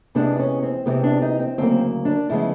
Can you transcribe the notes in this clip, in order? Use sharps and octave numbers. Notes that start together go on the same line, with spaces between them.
E2 C3 E3 G#3 B3 D4
C#4
C4
C3 E3 G#3 B3 C4
D4
D#4
C4
D2 C#3 F#3 A#3 C4
D4
D2 C#3 F3 G#3 B3 E4